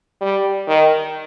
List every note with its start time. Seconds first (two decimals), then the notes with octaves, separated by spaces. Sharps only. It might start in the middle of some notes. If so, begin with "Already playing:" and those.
0.21 G3
0.68 D#3